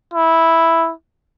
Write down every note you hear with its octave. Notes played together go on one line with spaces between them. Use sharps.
E4